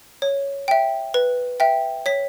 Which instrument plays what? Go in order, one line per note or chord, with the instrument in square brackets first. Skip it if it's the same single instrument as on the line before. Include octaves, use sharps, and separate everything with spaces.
[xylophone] C#5
E5 G5
B4
E5 G5
C#5 B6